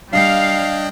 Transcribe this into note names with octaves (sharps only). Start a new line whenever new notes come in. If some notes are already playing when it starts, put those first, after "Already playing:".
G3 D4 D#5 F5 G5